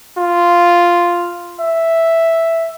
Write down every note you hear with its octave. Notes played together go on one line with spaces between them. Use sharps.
F4
E5